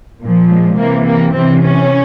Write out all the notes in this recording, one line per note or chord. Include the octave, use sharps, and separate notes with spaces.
A#2 F3
G#3
C3 E3 A#3
A#3
C3 E3 C4
C#4